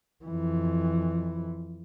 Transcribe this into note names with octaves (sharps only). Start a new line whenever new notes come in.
F2 E3